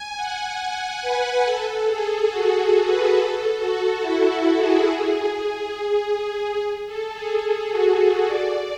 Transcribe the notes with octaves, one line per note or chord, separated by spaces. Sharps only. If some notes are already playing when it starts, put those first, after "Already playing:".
Already playing: G#5
F#5
F#5
B4
A4
G#4
F#4
A4
B4
A4
F#4
E4
F#4
G#4
G#4
G#4
G#4
A4
G#4
A4
F#4
G#4
D5